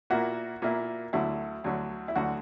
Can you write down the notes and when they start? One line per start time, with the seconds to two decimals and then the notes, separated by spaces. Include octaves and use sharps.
0.10 A#2 A#3 E4 F#4
0.62 A#2 A#3 E4
1.13 D2 D3 F#3 E4
1.64 D2 D3 F#3
2.08 E4
2.16 D2 D3 F#3 F#4